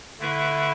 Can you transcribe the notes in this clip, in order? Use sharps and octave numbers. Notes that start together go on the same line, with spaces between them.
D3 A3 E4 B4 E5